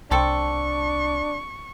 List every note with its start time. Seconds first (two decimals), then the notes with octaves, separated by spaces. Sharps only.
0.11 C2 C4 D4 A4 C#6